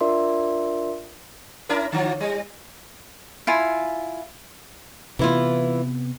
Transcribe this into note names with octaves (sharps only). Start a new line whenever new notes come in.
D4 F4 A#4 D5 E5 C6
C#4 E4 A#4
D3 F3
G3
E4 F4 G#5
C3 E3 B3 E4 F4